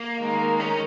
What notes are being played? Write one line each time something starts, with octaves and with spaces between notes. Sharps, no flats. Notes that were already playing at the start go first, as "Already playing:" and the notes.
Already playing: A#3
D#3 G#3 D#4 A#4
C#4